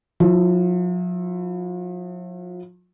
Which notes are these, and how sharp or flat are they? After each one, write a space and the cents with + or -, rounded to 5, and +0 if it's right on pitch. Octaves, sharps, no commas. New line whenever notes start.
F3 +45 E4 +15